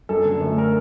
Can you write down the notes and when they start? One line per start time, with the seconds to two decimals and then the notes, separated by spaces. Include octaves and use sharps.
0.09 F#2 A4
0.25 D3
0.41 A3
0.58 A#4